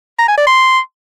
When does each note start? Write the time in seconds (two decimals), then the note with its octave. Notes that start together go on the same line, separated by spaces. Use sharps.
0.19 A#5
0.28 G#5
0.37 D5
0.47 C6